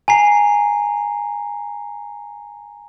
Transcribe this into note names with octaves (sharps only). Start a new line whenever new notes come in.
G#5 A#5 C7